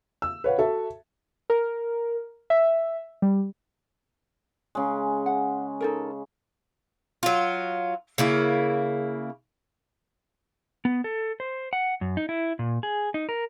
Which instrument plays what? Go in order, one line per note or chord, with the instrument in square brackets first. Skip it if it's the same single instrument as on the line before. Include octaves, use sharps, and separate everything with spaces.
[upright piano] E6
B4 C#5 F5 F#5
F#4 A4 E5 A5
[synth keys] A#4
E5
G3
[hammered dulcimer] C#3 G#3
[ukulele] F#5
D#4 A4 A#4
[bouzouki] F#3 F4
C#3 A#3 E4
[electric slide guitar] B3
A4
C5
F#5
F#2
D#4
E4
A#2
G#4
D#4
A#4